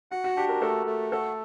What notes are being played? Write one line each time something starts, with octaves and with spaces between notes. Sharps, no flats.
F#4 F#5
F#4
D4 G4
A#4
A3 A4
A3
F#4 A4